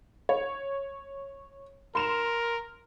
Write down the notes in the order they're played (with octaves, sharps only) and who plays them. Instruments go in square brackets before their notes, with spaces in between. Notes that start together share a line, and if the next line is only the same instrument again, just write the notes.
[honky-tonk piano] C#5
[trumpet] A#4 [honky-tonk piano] C6 E7 F7